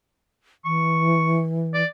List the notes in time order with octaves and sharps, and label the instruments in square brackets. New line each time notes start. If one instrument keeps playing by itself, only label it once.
[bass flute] E3 [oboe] C#6
[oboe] D5